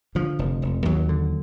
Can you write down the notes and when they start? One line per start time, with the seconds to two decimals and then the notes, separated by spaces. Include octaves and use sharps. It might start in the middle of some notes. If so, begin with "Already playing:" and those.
0.15 D3 F3
0.39 F1
0.62 F1
0.85 D#2 F#3
1.09 D3